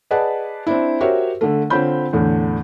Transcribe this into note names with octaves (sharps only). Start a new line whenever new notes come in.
G#4 B4 D5 D#5 F#5 A5
C4 D4 E4
F#4 G4 A#4 C5 C#5 E5
D3 A3
D3 C4 F4 C#5 B5 G6
E2 A2 D3